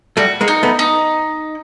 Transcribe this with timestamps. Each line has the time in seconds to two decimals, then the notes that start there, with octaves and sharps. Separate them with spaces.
0.17 G3 A3 F#4
0.41 G#3 A#3
0.48 D#4
0.63 A3 B3
0.79 D#4